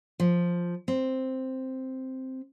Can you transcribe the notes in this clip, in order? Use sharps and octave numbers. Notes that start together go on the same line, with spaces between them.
F3
C4